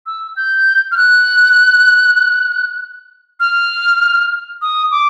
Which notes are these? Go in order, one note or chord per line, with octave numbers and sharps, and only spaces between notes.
E6
G6
F6
F#6
F6
D#6
D6